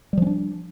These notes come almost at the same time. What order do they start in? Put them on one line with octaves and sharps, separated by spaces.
G3 F3 C#4 D4